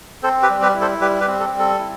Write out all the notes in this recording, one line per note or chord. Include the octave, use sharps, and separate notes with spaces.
C4 A4 C5
G4 B4
G3
G4 B4
E4
A4 C5
G3 G4 B4
G4 B4
C4
A4
G3
A4
E4